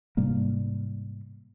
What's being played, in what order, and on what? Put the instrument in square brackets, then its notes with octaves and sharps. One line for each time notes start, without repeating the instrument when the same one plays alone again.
[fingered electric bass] G#2 C3 G3 A#3